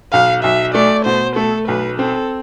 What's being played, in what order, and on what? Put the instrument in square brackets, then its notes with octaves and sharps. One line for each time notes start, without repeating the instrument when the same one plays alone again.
[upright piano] B1 [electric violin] F5
[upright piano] B1 [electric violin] E5
[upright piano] A3 [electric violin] D5
[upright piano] B2 [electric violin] C5
[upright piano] A3 [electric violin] A4
[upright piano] B1 [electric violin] B4
[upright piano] C4 [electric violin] A4